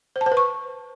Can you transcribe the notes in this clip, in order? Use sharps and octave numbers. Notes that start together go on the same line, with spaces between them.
C5
A5
C5
B4
C#6